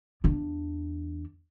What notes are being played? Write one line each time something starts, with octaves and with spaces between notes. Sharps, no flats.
E2 D4